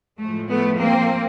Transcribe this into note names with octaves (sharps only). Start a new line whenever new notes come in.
A2 F3 G#3 A3
A3 B3
A#3 C4